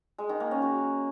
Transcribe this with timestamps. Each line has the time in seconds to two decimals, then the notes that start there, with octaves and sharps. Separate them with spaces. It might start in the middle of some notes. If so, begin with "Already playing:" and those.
0.18 G#3
0.29 D#3
0.40 A#3
0.51 C#4
0.62 F#4